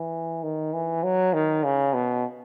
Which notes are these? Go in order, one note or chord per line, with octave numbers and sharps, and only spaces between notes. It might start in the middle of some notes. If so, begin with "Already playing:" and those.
Already playing: E3
D#3
E3
F#3
D#3
C#3
B2